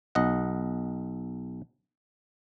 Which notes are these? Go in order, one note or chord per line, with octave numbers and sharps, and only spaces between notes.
B1 D#5 F#5